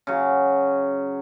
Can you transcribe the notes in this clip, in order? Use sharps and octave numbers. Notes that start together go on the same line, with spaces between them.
C#3 F#3